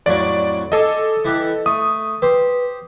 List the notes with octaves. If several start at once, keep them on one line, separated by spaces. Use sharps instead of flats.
F2 A2 F#3 D5
G#4 A4 D#5 D6
E3 G4 F#5
A3 D#6
G4 B4 C5